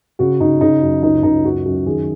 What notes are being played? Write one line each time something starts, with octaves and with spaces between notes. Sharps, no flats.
C#3 F#4
C#3 D#4
C#3 D#4
F#2
C#2 D#4
C#2 D#4
F#2 F#4
F#2
D#3 G#4